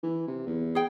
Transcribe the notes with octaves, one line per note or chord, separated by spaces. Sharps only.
E3
C3
E2
G#4 G5